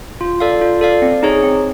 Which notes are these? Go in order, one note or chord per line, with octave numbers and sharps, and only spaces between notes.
F4
A4 D5 F5
F4
A4 D5 F5
C4
D#4 G#4 C#5
C4